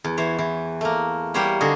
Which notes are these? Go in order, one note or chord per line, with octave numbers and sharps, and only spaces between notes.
E2
E3 C5 C#5
E3
A3 A#3
G3 A#3 G4 C5 C#5 F#5
D3 D#4 F#4 G#4